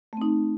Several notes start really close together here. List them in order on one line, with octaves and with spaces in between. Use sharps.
A3 C4 D#4